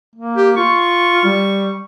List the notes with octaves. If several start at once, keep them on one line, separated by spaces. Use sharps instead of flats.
A#3
G4
F4 C#6
G3